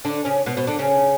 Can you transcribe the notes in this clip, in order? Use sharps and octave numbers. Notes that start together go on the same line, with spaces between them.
D3 D4
C#3 C#4
B2 B3
B2 B3
D3 D4
C#3 C#4